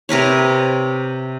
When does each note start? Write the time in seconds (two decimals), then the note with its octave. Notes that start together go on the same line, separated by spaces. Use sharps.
0.09 C3 A#4 B4 C#5